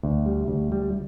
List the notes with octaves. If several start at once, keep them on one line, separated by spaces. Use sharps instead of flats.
D2
G3
D2
G3